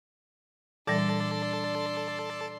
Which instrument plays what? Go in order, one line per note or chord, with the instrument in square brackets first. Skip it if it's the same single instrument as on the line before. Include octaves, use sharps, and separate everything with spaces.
[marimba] A#2 E3 G3 [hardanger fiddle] D4 C6 [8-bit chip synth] A4 D5 A5